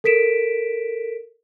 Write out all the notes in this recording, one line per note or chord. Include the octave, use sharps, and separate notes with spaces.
A4 A#4 B6 D7 E7